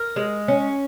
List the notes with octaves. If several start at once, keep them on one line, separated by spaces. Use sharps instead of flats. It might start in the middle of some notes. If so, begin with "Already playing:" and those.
Already playing: A#4
G#3
C#4